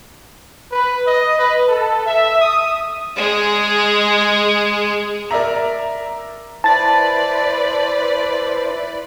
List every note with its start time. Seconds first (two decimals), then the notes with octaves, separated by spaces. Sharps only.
0.72 B4
1.07 D#5
1.39 B4
1.68 A4
2.06 E5
2.42 D#6
3.16 G#3 G#4
5.31 A#4 D5 E5 A#5
6.64 E4 B4 C5 D5 A5 A6